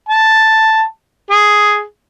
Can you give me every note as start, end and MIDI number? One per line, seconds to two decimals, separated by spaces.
0.09 0.83 81
1.30 1.83 68